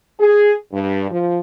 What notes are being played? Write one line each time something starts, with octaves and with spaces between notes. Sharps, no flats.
G#4
G2
F3